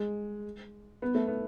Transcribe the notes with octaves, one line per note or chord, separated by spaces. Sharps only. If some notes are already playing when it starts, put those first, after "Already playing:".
Already playing: G#3
B3
A3
B3